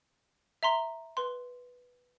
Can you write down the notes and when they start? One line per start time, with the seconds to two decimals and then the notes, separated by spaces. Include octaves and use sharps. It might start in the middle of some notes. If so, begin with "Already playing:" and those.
0.63 E5 A#5 C6
1.17 B4 C6